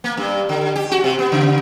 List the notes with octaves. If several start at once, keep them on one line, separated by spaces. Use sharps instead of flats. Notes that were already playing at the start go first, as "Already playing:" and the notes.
A#3
G2
D3
G4
F#4
C3
B3
C#3